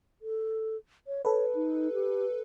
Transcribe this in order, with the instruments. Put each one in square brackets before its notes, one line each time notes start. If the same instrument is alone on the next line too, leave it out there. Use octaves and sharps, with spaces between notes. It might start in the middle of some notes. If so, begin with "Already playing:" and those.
[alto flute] A4
C#5
[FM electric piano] A4 B4 [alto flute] C#5
[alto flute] D#4
G4